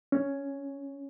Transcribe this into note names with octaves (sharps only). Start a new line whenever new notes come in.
C#4